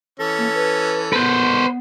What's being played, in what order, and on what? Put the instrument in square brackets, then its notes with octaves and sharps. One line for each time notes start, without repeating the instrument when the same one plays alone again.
[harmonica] E3 C#4 [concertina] A4
[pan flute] A#3
B4
[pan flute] B3 [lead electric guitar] B4 C5